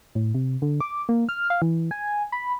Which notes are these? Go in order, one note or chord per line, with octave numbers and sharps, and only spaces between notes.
A2
C3
D3
D6
A#3
F6
F5
E3
G#5
B5